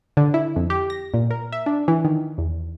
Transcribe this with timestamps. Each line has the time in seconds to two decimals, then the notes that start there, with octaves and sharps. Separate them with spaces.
0.17 D3
0.34 E4
0.56 F2
0.70 G4
0.90 A#6
1.14 A#2
1.31 A#4
1.52 E5
1.66 D4
1.88 E3
2.05 D#3
2.38 E2